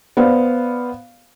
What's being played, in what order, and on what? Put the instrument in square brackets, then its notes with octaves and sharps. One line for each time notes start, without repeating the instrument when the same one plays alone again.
[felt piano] B3 C5 D5 F5